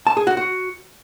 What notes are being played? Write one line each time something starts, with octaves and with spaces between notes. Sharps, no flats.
A5
G#4
F#4
F#4